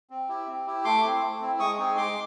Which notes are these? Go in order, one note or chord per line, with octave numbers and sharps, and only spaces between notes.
C4
E4 G4
C4
E4 G4
A3 C6 D6
C4 E4
A3
C4 E4
G#3 C#6 D#6
C4 D#4 G#4
G#3 C6 D6